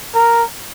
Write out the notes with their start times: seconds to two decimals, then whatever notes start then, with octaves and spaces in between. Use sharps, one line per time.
0.14 A#4